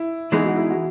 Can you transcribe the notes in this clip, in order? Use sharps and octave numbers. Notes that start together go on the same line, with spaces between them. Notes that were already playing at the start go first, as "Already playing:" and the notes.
Already playing: E4
E3 G#3 B3 D#4 G#4
F#4
E4
F#4